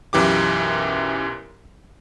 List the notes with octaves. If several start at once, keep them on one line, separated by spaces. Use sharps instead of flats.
B1 F#2 E3 G4 D6